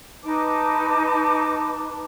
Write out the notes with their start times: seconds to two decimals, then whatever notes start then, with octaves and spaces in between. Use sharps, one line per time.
0.24 D#4 B4 A5 D6